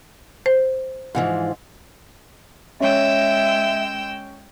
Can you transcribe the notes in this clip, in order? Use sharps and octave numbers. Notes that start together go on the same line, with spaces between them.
C5
G#2 E3 F3
G#3 C#4 E5 G5 E6